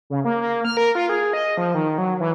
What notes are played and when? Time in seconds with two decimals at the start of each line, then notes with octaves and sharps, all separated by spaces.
0.10 C#3
0.25 A#3
0.41 A#3
0.65 F6
0.77 A#4
0.95 F4
1.09 G#4
1.33 D#5
1.57 F3
1.74 D#3
1.98 F#3
2.20 E3